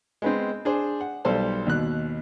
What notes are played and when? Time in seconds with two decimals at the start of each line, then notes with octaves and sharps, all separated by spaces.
0.22 G#3 B3 C4
0.65 D4 G#4 C5
1.01 F#5
1.25 B1 G3 A4 C5 C6
1.66 D#2 B2 F#6